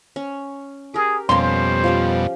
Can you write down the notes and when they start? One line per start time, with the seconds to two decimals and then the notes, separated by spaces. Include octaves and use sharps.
0.16 C#4
0.94 G4 G#4 A#4
1.29 F2 B2 G3 A#3 C#4 G4 C5 C6
1.84 F3 C#4 G4